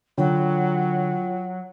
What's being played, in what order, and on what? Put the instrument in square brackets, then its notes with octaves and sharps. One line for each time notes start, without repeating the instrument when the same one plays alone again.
[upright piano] D3 [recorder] F#3 [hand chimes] F4 C#5 G5